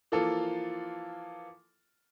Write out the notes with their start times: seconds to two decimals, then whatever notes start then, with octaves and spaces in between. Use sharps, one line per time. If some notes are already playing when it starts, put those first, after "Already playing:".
0.12 E3 F3 A#3 F4 A4